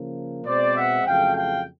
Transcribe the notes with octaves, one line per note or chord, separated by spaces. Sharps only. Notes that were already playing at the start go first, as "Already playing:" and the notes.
Already playing: C#3 F3 A#3
B2 G#3 C4 C5 D5
E5 F#5
F2 C#3 F#3 A3 F5 G5
F5 G5